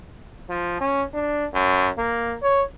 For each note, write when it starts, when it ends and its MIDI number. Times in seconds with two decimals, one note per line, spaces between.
0.49 0.78 53
0.81 1.03 61
1.14 1.45 62
1.54 1.89 42
1.98 2.36 58
2.42 2.62 73